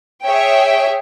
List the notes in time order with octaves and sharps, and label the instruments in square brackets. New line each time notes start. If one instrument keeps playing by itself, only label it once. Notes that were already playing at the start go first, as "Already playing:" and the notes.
[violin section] G#4 C#5 E5 G5